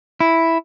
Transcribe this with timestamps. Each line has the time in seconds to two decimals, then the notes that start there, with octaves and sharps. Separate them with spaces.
0.20 E4